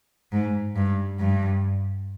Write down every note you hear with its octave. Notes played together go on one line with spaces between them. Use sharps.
G#2
G2
G2